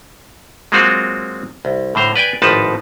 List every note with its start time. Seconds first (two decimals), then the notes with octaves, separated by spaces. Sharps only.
0.72 F#3 G#3 A#3 C4 F4 F#4
1.65 C2
1.95 A2 D3 C5 A#5
2.16 B4 D5 G5 G#5
2.42 G#1 A2 F3 D#4 B4 A5